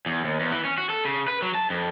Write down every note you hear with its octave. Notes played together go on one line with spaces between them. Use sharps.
E2
D#2
E2
E3
C#4
F#4
A4
C#3
B4
F#3
A5
F2